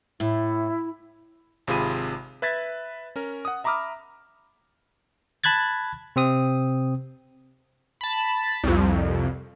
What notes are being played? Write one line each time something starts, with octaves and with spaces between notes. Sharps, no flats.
A2 E4
G#1 C3 F4 G#4 B5 D#7
B4 E5 G#6 A6 B6
C#4 A#4
F#5 D#6
E5 A#5 B5 D6 D#6 F6
A5 B5 F#6 G#6 A6
C3 C4 D#6
A5 B5
C2 F2